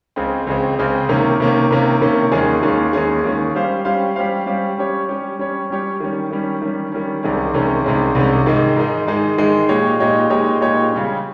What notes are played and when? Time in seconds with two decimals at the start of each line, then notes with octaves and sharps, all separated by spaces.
0.16 C#2 C#3 G#3 C4
0.47 C#2 C#3 G#3 C4
0.78 C#2 C#3 G#3 C4
1.09 C3 D#3 A#3 C#4
1.40 C3 D#3 A#3 C#4
1.71 C3 D#3 A#3 C#4
2.01 C3 D#3 A#3 C#4
2.32 D#2 D#3 G#3 C#4 G#4
2.62 D#2 D#3 G#3 C#4 G#4
2.93 D#2 D#3 G#3 C#4 G#4
3.24 D#2 D#3 G#3 C#4 G#4
3.55 G3 C#4 G4 C5 F5
3.85 G3 C#4 G4 C5 F5
4.16 G3 C#4 G4 C5 F5
4.46 G3 C#4 G4 C5 F5
4.77 G3 C#4 G4 C#5
5.08 G3 C#4 G4 C#5
5.39 G3 C#4 G4 C#5
5.70 G3 C#4 G4 C#5
6.00 D#3 G3 C#4
6.30 D#3 G3 C#4
6.62 D#3 G3 C#4
6.92 D#3 G3 C#4
7.23 C2 C3 D#3 G#3 C#4
7.54 C2 C3 D#3 G#3 C#4
7.84 C2 C3 D#3 G#3 C#4
8.15 C2 C3 D#3 G#3 C#4
8.46 G#2 D#3 G#3 D#4
8.76 G#2 D#3 G#3 D#4
9.07 G#2 D#3 G#3 D#4
9.38 G#2 D#3 G#3 D#4
9.69 A#2 G#3 D#4 G4 C#5
10.00 A#2 G#3 D#4 G4 C#5
10.30 A#2 G#3 D#4 G4 C#5
10.61 A#2 G#3 D#4 G4 C#5
10.92 C#3 G3 C#4